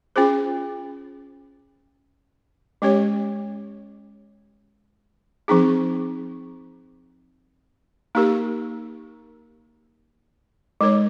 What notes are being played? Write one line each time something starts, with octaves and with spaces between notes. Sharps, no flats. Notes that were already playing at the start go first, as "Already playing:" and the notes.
C#4 F4 G#4 C5
G#3 C#4 G4 C#5
F3 C4 D#4 G#4
A#3 D#4 G4 A#4
G#3 D#4 A#4 C#5